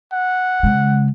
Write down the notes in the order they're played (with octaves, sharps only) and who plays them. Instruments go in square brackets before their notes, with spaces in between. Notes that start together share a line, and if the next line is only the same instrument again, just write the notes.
[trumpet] F#5
[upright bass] C#3 G#3